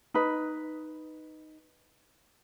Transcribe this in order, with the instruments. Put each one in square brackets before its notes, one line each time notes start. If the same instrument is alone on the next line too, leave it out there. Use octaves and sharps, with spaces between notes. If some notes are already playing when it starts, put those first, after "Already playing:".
[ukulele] D#4 B4